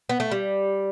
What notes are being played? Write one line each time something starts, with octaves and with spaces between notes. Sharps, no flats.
B3
A3
G3